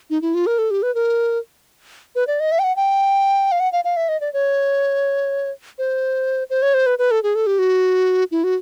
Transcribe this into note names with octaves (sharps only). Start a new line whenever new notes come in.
D#4
E4
F4
A#4
A4
G4
B4
A#4
B4
D5
D#5
E5
G5
F#5
G5
F5
F#5
F5
F5
E5
D#5
D5
C#5
C5
C5
C#5
C5
B4
B4
A4
G#4
A4
G4
F#4
E4
F#4